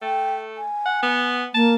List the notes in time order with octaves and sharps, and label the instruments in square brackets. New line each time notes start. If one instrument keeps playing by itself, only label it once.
[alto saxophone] A3 [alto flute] G5
[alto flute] G#5
[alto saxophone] F#5
B3
[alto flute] A#3 [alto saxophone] A5